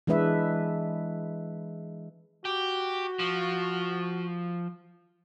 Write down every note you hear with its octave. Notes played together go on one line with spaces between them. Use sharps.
E3 G#3 D4 B4 E5
F#4 G4
F3